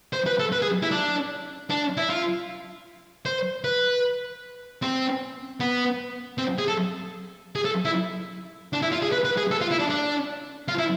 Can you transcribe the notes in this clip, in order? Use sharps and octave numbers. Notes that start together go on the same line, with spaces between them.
C5
B4
A4
B4
G#4
E4
D4
D4
E4
F4
C5
B4
C4
B3
C4
G#4
A4
G#4
A4
E4
D4
E4
F4
G#4
B4
B4
G#4
A4
F4
E4
D4
D4
F4
E4